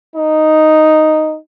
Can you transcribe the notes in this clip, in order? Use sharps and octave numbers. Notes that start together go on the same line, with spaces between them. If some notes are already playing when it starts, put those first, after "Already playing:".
D#4